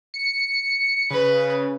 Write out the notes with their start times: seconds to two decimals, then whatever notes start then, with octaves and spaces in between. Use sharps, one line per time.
0.14 C#7
1.11 C#3 B4